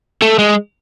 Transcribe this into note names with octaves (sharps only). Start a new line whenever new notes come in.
A3
G#3